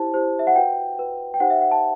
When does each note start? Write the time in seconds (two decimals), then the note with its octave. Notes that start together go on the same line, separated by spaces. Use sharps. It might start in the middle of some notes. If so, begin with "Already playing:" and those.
Already playing: E4 G4 C5 A5
0.14 E4 G4 C5
0.39 E5
0.47 F#5
0.55 F#4 B4 G5
0.98 F#4 B4
1.34 G5
1.40 D#4 G4 C5 F#5
1.50 E5
1.61 F#5
1.71 A5